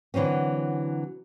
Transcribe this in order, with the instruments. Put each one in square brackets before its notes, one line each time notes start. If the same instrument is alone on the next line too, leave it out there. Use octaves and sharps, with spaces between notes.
[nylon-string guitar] D3 E3 F#3 C4 C#4